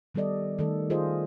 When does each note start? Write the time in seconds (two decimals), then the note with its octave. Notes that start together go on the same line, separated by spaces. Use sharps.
0.15 D#3 G3 B3 A4 D5 D#5
0.59 D#3 A3 A4
0.90 F4 G#4 C5 D#5